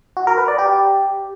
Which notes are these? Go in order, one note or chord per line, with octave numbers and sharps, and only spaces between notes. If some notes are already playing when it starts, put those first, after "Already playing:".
F#4
A#4
B4
D5
G4